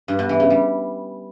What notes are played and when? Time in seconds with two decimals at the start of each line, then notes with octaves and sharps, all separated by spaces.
0.08 G2
0.19 B2
0.29 E3
0.40 C#3
0.50 G3